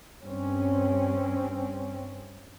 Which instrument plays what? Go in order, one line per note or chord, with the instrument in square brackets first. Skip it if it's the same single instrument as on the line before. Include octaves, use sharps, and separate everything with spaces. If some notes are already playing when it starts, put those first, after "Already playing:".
[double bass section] G2 C4 C#4